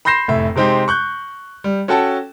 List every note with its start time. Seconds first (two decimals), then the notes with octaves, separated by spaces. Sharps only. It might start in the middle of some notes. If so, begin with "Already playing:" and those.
0.05 B5 C6 G6 A#6 C7 E7
0.28 F1 A2 E5
0.56 C3 G#3 C4 D#4 G4
0.88 C#6 F#6 G6
1.64 G3
1.88 C#4 F#4 A4 G5 A5